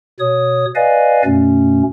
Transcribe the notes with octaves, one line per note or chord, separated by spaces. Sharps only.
B2 C#5 D#6
B4 D5 D#5 F5 G#5
F#2 B2 A3 C#4